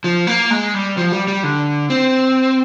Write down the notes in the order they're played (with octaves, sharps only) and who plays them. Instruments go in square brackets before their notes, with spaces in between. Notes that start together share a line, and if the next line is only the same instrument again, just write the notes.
[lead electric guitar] F3
A#3
G#3
G3
F3
G3
G3
D3
C4